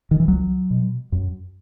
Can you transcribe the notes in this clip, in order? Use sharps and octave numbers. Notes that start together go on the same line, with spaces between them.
D#3
E3
C#2 F#3
B2
F#2